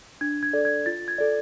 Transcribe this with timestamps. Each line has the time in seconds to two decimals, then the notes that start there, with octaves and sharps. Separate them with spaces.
0.21 D4 G#6
0.43 G#6
0.53 A4 D5
0.65 G#6
0.86 F4 A6
1.08 G#6
1.18 A4 D5